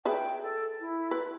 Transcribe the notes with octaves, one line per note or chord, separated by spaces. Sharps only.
G#4 B4 E5 G5
A4
E4
B4